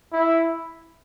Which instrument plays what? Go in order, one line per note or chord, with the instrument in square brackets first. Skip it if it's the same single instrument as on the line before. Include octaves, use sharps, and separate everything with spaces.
[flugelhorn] E4